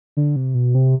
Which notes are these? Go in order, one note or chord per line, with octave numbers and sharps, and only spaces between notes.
D3
C3
B2
C3